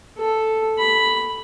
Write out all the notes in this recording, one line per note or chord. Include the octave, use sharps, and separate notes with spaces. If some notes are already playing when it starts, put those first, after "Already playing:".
A4
B5